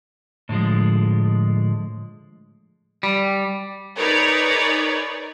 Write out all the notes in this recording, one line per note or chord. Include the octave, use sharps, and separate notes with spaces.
A2 D3 F3 G#3
G3
D#4 G#4 A#4 B4 C#5 D5